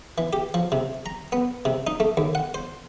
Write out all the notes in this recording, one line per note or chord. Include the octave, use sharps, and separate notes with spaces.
E3
G4
F3
C3
A#5
B3
C3
D#4
A3
D#2
F#5
C5